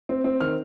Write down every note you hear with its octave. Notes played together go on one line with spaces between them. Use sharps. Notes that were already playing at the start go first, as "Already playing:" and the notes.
C4
C4
D#3 F6